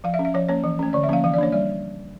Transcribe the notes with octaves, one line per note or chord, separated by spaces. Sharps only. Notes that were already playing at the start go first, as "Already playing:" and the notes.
F3 F5
E5
C#4
E5
F3 C#5
A#3 C#4 C#5
E3
A3 C#4
D3 D5
E5
F3 A#3 C#4 F5
E3 F5
D5
A#3 D4 C#5
G3 D5